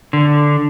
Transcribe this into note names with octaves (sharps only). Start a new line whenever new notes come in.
D3